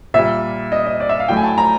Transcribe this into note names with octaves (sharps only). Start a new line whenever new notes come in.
A#2 G3 E5
D#5
D#5
D5
E5
F5
A2 F#3 A3 G5
G#5
A5
A#5